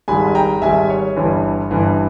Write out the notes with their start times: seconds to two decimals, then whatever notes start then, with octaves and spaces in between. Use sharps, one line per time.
0.08 G#1 G#2 G3 G#5 B5
0.35 G5 A#5
0.62 G#1 G#2 G3 E5 G#5
0.90 C#5
1.16 G1 G2 E3
1.71 G1 G2 E3